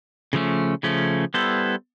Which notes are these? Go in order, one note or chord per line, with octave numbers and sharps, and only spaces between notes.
C#3 F3 A3 C#4
C#3 F3 A3 C#4
G3 B3 E4 A4 C5